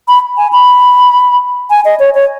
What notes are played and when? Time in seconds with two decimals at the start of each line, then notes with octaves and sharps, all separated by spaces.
0.08 B5
0.37 G#5
0.53 B5
1.70 G#5
1.85 D#5
2.00 C#5
2.15 C#5